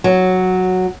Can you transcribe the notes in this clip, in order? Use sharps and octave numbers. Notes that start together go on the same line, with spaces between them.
F#3